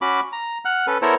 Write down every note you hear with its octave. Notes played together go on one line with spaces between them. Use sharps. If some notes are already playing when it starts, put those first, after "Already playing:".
C#4 F#4 B5 D6
A#5
F#5 F6 F#6
C#4 A4 B4
B3 E4 A4 A#4 C5 C#5